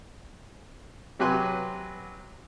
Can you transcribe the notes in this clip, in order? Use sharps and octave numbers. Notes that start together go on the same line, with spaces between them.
C3 F#3 G4 B4 G#5 C6